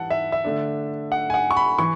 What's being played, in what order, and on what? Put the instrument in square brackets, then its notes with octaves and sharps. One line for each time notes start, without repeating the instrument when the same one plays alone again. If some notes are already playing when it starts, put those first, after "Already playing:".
Already playing: [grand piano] E3 F#5 A5
E5
E5
D3 A3 D4
F#5
G#5
F#5
C#6
B5
E3 C#6